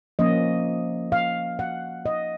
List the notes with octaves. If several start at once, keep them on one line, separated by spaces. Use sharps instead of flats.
F3 A#3 C#4 D#5
F5
F#5
D#5